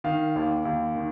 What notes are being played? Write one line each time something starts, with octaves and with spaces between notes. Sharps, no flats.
D#3 F5
D#2
D#2
D#3